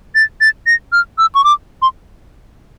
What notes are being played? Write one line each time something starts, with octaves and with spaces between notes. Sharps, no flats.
A6
A6
A#6
F6
E6
C#6
D6
C6